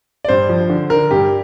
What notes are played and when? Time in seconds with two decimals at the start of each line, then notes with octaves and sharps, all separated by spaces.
0.25 D5
0.28 G2 C5
0.49 F3
0.70 D3
0.90 D3 A#4
1.11 G2 G4